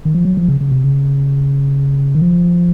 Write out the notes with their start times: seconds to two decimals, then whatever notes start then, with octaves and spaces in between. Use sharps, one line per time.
0.05 D#3
0.14 F3
0.25 F#3
0.37 F3
0.48 C#3
0.61 C#3
0.72 C3
0.84 C#3
2.15 D#3
2.22 F3